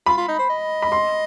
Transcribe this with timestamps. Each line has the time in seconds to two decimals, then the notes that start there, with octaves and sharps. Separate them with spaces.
0.06 F4 B5
0.17 F4
0.28 D#4
0.39 C5
0.49 D#5
0.82 B5
0.92 C6